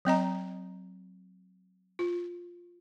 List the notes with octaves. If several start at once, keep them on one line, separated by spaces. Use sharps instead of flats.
F#3 C4 D#5 A#5
F4